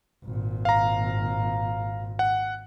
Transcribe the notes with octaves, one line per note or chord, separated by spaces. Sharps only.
G#1 A#2
F5 A#5
F#5